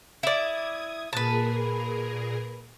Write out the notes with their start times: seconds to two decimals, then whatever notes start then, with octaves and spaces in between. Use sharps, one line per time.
0.23 E4 D5 D#6 G#6
1.13 A#2 G#4 A#4 B4 A5